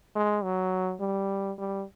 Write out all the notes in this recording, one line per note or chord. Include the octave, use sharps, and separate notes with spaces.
G#3
F#3
G3
G3